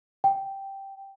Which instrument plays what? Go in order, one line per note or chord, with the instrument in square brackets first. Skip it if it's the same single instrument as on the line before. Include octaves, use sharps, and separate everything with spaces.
[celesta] G5